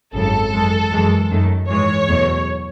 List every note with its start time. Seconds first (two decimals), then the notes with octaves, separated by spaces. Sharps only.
0.14 G#1 F#2 C#3 A4
0.52 F#2 E3 G#3
0.91 F#2 E3 G#3
1.30 F#2 D#3 A3
1.68 G#2 E3 G#3 C#5
2.08 E2 B2 F#3 A3